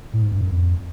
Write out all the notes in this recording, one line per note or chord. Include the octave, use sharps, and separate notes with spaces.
A2
G#2
G2
F#2
F2